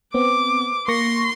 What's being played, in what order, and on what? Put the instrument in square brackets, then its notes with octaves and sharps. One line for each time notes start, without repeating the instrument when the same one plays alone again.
[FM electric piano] B3 C4 [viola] D6
[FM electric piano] A#3 C#6 A#6 [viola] C6